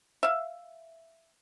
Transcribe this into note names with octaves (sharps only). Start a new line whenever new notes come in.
E5 F5